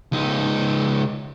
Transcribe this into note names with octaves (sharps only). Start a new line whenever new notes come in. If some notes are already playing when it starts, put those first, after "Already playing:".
C#2 D#4